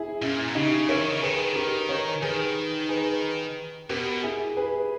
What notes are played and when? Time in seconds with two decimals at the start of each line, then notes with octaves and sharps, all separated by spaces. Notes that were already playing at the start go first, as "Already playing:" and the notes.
Already playing: E4 G#4
0.22 A#2 C#4 E4
0.48 B2
0.55 C#3 D#4 G4
0.89 E3 A#4 C#5
1.01 D#3
1.13 C#3
1.22 D#3 G#4 B4
1.55 G4 A#4
1.89 A#4 C#5
2.22 D#3 G#4 B4
2.89 G#4 B4
3.89 B2 G4 A#4
4.23 E4 G#4
4.57 G#4 B4